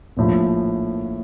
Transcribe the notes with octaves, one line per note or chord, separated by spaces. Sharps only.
A#1 A2 F3